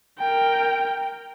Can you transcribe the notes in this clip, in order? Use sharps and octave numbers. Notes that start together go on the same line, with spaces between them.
A#4 G5